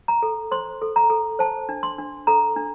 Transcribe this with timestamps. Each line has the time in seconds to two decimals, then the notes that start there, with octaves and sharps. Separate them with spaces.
0.08 A#5
0.23 A4
0.51 C5 C6
0.82 A4
0.96 A#5
1.10 A4
1.39 C5 A5
1.69 D4
1.83 C6
1.98 D4
2.27 A4 A#5
2.56 D4